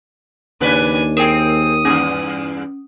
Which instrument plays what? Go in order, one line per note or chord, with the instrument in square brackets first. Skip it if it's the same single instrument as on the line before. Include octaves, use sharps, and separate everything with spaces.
[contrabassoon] D#2 [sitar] A2 C#3 B4 [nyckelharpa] D4 G#5
[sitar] C4 G#4 [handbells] A#4 G5 [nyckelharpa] D#6
[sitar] E2 G2 G#4 [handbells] C#4